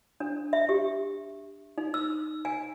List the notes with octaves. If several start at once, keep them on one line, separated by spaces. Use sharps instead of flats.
D4
E5
G4
D#4
E6
G#5